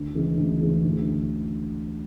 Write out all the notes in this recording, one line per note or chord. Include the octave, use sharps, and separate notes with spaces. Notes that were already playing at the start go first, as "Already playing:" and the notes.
Already playing: D2
C#3 E3 G#3
D2
C#3 E3 G#3
D2